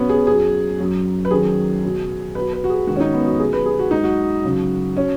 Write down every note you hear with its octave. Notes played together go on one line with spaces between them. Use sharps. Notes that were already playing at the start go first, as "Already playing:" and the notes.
Already playing: B2 F#3 B3 C#4
G#4
F#2 F#3 G#4
F#2 F#3
B4
F#2 D#3 F#3 G#4
B2 F#3
B2 F#3 B4
B4
F#4
G#4
G#2 D#3 F#3 F#4
C#4
D#4
B3
F#4
B2 F#3 G#4
B4
G#4
F#4
G#2 F#3 D#4
F#4
F#2 C#3 F#3
F#3 C#4